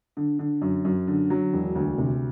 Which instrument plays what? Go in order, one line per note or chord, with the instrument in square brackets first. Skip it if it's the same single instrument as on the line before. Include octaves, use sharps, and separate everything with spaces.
[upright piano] D3
D3
F#2
F#2
D3
F#3
E1
D2
C3